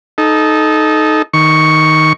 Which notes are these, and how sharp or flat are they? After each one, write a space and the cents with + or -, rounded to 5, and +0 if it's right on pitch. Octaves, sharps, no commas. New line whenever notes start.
D#4 +0 A4 -25
D#3 +0 C#6 +0